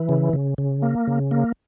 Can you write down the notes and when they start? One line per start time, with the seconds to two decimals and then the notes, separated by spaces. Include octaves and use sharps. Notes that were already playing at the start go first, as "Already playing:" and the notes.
Already playing: E3
0.09 C#3
0.33 C#3
0.58 C#3
0.82 A#3
1.07 C#3
1.31 A#3